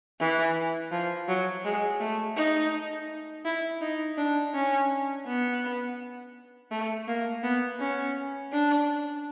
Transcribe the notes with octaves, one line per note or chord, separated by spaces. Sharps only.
E3
F3
F#3
G#3
A3
D#4
E4
D#4
D4
C#4
B3
A3
A#3
B3
C#4
D4